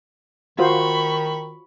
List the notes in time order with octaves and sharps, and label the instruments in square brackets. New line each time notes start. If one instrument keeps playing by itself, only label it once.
[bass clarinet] D#3 [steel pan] F4 F#4 C5 [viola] B5 C#6